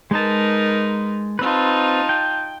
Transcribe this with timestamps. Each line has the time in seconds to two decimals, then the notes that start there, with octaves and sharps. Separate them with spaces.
0.11 G#3 D#4 A#4 B4 A5
1.39 C4 D#4 F4 B4 A5
2.09 G5